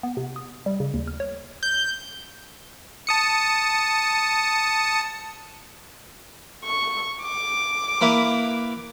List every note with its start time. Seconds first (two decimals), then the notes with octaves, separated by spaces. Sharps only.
0.03 B3
0.17 C3
0.36 D#6
0.66 G3
0.80 C#3
0.94 D#2
1.07 F6
1.20 C#5
1.63 G6
3.07 A5 D#6 C#7
6.64 C#6
7.23 D6
8.01 A#3 E4 B4